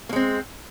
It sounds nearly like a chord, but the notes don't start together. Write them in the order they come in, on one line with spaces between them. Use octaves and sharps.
A#3 G#3 C4